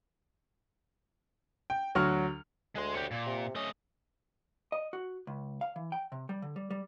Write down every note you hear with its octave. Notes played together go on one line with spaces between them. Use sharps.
G5
D2 F#3 F#4 C#6 F6
D2 G#3 C6
G4 C#5
A#2
C3
A3 C#4 D#5
D#5
F#4
C#2
F5
E3
G5
C3
G3
D3
G3
G3